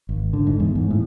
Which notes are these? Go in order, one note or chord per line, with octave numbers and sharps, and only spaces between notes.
G#1
D3
G#2
E2
G#2
A2